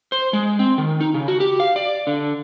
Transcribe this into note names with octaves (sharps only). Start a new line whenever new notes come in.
C5
G#3
C4
D#3
D#4
C#3
F#4
G4
F5
D5
D3